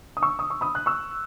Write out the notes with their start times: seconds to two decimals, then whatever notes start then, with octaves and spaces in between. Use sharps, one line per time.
0.17 D#6
0.23 C#6 E6
0.39 D#6
0.50 C#6
0.61 B5 D#6
0.75 F#6
0.86 C#6 E6